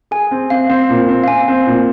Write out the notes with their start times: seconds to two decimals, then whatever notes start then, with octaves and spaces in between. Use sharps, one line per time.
0.11 G#4 G#5
0.31 C4
0.50 C4 F5
0.69 C4
0.90 A#2
1.08 C4
1.24 F5
1.28 C4 G#5
1.48 C4
1.67 A#2